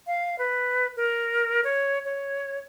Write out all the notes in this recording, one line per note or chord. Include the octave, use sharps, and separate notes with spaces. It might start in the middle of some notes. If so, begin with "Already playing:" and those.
F5
B4
A#4
C#5
C#5